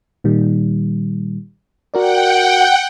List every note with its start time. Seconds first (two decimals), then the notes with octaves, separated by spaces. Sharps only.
0.24 A#2 D#3 G3
1.94 F#4 A#4 D5 F#5 G5